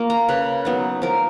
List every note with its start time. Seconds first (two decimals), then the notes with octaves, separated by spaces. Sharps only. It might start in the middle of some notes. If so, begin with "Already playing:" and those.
Already playing: A#3 F4 C#6
0.10 A#5
0.29 C#3 B4
0.65 F#3 B3 D#4
1.02 F3 A#4